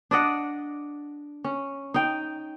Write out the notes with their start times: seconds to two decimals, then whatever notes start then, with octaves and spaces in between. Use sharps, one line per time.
0.11 D4 D5 D#5 F#5
1.44 C#4
1.94 D#4 G5